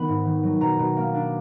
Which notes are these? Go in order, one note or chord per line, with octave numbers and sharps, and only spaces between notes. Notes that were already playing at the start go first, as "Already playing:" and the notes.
Already playing: D#3 B3 B5
G#2
D#3
F#3
B2 A#5
B2
A#3
D4